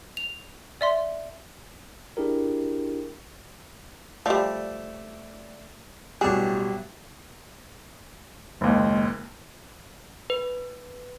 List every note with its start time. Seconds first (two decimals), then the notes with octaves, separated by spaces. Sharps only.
0.17 F7
0.81 D5 E5 C6
2.17 D4 E4 G4 G#4 A#4
4.26 F3 G3 A3 D5
6.21 A1 B2 F#3 G3 D4 G4 G#4
8.61 F#1 D#2 G#3
10.30 B4